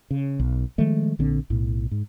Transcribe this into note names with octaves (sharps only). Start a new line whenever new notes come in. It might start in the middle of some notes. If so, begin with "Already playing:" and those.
C#3
B1
D#3 F3 G#3 A3
A#1 D3 C4
B1 A2
G#2